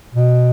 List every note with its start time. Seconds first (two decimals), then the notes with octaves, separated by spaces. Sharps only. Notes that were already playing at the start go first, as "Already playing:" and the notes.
0.14 B2